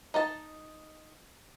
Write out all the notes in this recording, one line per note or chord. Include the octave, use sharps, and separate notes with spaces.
D#4 D#5 A5